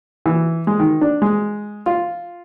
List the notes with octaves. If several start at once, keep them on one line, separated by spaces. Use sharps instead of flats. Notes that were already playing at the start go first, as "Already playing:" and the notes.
E3
G#3
D#3
D4
G#3
F4